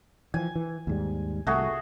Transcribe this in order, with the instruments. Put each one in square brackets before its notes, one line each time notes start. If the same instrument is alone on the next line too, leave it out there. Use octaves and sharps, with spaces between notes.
[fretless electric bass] E3 F3 [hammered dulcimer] G#5
[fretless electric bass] E3
D#2 G#2 G3
[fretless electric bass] C2 [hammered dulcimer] A3 F#4 G#4